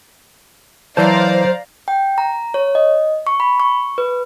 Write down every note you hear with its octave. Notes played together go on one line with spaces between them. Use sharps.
E3 F#3 C5 D5 F5 A5 A#5
G5
A#5
C#5
D#5
C#6
B5
C#6
B4